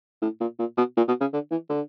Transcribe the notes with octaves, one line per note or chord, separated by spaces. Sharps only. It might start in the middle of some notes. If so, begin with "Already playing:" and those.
A2
A#2
A#2
B2
A#2
B2
C#3
D3
E3
D3